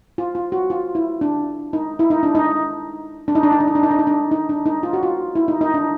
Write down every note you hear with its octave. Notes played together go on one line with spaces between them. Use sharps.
F4
F4
F#4
F4
E4
D4
D#4
E4
D#4
D4
D#4
D4
D#4
D4
D#4
D4
D#4
D4
D#4
D4
D#4
D4
D#4
D4
D#4
F4
F#4
F4
E4
D#4
D#4
D4